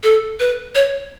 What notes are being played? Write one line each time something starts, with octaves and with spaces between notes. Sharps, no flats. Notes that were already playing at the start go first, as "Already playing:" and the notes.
A4
B4
C#5